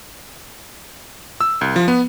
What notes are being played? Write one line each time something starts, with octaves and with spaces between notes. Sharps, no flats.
E6
C2
F3
B3